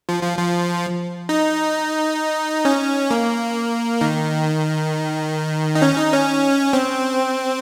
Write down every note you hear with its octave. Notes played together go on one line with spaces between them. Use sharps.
F3
F3
F3
D#4
C#4
A#3
D#3
D#4
C#4
D#4
C#4
C4